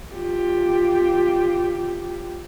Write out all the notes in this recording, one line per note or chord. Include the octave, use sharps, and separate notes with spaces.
F4 G4